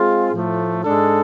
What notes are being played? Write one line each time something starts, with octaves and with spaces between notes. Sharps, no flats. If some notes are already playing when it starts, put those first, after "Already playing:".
Already playing: G#3 C4 F4 G#4
A2 F3 A3
G#2 G#3 D4 A4